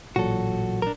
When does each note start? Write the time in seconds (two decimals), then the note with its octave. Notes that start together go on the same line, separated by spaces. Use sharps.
0.16 A1 A#2 F#3 F#4 A4
0.82 D4 A#4